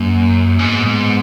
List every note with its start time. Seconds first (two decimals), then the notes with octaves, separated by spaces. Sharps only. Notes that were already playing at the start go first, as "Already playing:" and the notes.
Already playing: F#2 A#3
0.59 G#2 B3
0.86 G#2